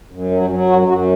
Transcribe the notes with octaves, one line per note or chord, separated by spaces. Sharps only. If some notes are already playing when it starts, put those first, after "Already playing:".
F#2
F#3
F#3 C#4
F#2 F#4
F#2 F#4